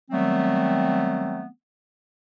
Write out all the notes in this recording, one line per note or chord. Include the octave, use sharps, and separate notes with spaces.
D#3 F#3 G3 A3 B3 C4